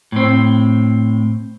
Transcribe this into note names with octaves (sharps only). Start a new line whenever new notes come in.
A2 C4